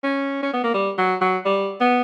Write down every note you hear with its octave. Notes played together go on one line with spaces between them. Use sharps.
C#4
C#4
B3
A#3
G3
F#3
F#3
G3
B3